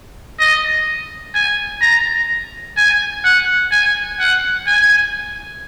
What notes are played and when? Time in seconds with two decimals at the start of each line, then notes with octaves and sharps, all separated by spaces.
0.40 D#5
1.35 G#5
1.82 A#5
2.77 G#5
3.24 F#5
3.72 G#5
4.20 F#5
4.67 G#5